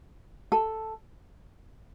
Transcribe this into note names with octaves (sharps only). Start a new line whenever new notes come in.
A4